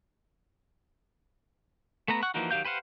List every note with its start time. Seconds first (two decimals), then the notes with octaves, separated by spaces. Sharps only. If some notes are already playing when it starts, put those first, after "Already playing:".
2.08 A3 B3 B4 A#5
2.23 F#5 C#6 F#6
2.34 E3 F3 A#3 D#4 F#4
2.51 D#3 F#3 G4 F5 G6
2.65 G4 B4 C5 F5 F#5